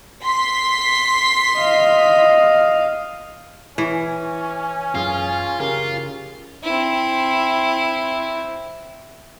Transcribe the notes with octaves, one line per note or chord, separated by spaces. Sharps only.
C6 B6
D#5 F5
E3 C#4 C#5
F#2 F4 G#4
C#3 F4 G4 A#4
C4 E4